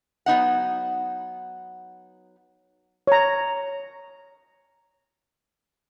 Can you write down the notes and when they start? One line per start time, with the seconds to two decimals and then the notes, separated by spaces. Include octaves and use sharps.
0.26 F#3 B3 D#4 F#5
3.07 C#5 A#5